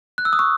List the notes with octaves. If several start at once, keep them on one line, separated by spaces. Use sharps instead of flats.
F#6
E6
D#6
C#6